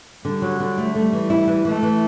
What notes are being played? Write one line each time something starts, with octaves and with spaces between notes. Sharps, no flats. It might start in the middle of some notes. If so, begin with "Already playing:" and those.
D3 G3
F#3
D3
A3
G3 A3
E3
E4
E3
E3 A3
E3